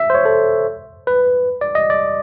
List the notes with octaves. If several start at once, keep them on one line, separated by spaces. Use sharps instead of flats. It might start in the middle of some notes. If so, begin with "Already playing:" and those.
Already playing: E5
C5
C#5
A4
B4
D5
D#5
D5